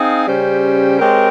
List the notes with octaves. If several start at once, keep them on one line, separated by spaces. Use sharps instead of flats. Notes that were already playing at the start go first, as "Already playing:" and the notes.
Already playing: C4 D#4 G#4 F5
C#3 G3 C#4 G4 C5
G#3 C4 G4 A#4 C#5